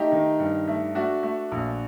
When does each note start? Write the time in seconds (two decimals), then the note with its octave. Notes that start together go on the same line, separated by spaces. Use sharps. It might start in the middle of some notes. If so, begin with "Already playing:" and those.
Already playing: A3 D#4 G4
0.12 D#3
0.39 G2
0.67 A3
0.95 A3 D4 F#4
1.23 A3
1.51 A#1